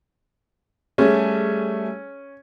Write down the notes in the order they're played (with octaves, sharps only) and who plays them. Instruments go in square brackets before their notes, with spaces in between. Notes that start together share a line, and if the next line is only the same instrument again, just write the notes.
[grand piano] G3 A3 [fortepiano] C#4 [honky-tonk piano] G#4